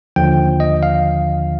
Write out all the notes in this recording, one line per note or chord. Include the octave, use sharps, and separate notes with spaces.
D#2 D3 F3 G5
D#5
F5